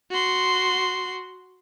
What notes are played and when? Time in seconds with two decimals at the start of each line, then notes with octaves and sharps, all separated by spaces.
0.11 F#4 C6